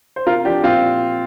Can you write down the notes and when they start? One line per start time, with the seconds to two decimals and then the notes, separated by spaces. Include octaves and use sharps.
0.16 C5
0.26 C3 F4 A#4
0.45 F3 D4 G4
0.63 A#2 C4 F4